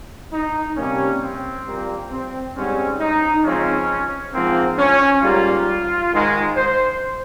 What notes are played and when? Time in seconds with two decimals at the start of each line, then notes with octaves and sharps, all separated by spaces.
0.33 D#4
0.77 C3 G3 A#3 C#4
1.22 C4
1.67 A#2 G3 A#3
2.11 C4
2.55 G#2 G3 C4 C#4
3.00 D#4
3.44 C#3 F3 G#3 C4 C#4
4.33 G#2 F3 A#3 C4
4.78 C#4
5.22 G#2 G3 A#3 F4
6.12 G#2 D#3 G#3
6.56 C5